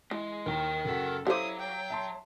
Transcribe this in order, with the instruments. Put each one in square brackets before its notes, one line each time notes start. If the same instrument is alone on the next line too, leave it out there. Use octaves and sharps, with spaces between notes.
[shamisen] E3 [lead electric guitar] G#3
[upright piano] D#2 [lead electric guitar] A#4 G5
[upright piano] F#1 B6 [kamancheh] F#4 A4
[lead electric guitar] F#3 [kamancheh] E4 D#6 [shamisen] G4 A4 C5 [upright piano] F5 D6
[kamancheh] G5
[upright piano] E5 A5 C6